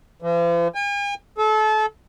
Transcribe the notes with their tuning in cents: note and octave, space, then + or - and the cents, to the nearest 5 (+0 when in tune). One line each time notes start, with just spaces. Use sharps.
F3 -45
G#5 -45
A4 -30